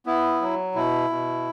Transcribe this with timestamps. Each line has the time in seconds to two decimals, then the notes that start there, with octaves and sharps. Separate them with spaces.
0.06 B3 E4
0.41 F#3
0.75 B2 E4
1.10 B2